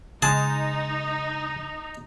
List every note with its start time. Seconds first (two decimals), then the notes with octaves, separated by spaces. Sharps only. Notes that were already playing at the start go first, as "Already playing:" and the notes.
0.22 C#3 G#3 D#4 G#4 A5